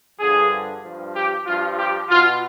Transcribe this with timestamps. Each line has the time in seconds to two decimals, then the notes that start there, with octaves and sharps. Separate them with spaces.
0.19 G2 D3 F3 G#4
0.83 G2 F3
1.15 G4
1.46 G2 F3 F4
1.78 G4
2.10 B2 F4